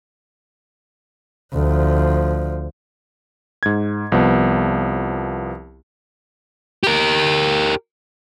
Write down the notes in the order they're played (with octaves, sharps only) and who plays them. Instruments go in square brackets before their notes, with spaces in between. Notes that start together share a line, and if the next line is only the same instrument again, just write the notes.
[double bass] D2 F3
[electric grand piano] G#2 G#6
C2 F3 B3
[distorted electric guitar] G4 A#4